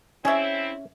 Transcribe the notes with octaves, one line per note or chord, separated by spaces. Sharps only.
C4 C#4 E4 G#4 E5